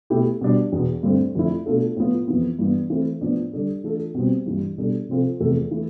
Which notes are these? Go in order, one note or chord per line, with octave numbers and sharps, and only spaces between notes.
B2 A3 E4 G4
B2 G3 D4
E2 B2 B3
G2 D3 A3 C4
F2 D3 A3 E4
B2 A3 D4 F4 A4
A2 F3 B3 F4
F2 E3 B3
G2 E3 B3
E3 A3 C4
A2 F3 B3 D4
D3 G3 D4 A4
E3 A3 D4 F4 A4
B2 G3 C4
G2 E3 G3
B2 G3 D4 A4
C3 F3 C4 F4 A4
E2 C3 F3 A3
E3 A3